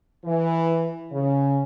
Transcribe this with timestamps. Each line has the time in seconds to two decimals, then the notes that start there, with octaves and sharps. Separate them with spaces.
0.25 E3
1.11 C#3